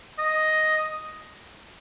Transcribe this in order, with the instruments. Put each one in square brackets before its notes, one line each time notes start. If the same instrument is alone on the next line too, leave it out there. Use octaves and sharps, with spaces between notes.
[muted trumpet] D#5